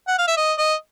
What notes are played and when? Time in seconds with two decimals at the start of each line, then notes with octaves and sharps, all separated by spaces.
0.08 F#5
0.18 F5
0.28 E5
0.37 D#5
0.58 D#5